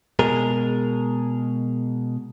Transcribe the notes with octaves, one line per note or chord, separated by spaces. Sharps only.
B2 G#3 G#4 A#4